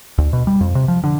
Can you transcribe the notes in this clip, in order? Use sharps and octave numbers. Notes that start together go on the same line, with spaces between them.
D2
B2
G3
F2
C3
F3
D3